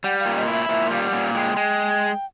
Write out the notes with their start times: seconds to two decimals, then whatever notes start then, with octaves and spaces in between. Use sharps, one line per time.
0.04 G3 F#5
0.20 F5
0.26 A#2
0.36 D#5
0.48 E4
0.53 E5
0.69 A#2 E5
0.91 G3 F5
1.02 G5
1.07 F#5
1.13 A#2
1.34 G#3 G5
1.56 G#3